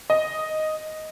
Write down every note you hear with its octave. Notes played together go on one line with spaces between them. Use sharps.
D#5